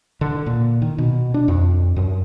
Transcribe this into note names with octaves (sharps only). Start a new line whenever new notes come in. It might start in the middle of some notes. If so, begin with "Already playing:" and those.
D3
A#2
D#3
B2
D4
F2
F#2